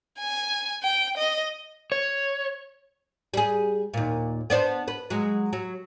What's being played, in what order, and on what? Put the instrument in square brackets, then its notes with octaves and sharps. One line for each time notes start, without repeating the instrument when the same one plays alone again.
[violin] G#5
G5
D#5
[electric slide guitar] C#5
[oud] G3 G#4
D#2 A#2
B3 D4 C5
B4
F#3 G#3
F#3